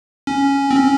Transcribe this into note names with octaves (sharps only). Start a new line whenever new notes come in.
C#4
C4
C#4